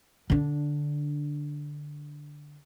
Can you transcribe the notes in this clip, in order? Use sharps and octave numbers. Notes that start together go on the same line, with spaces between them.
D3 D4